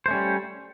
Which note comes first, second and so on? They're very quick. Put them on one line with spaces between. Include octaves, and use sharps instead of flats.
C5 A3 C#4 G3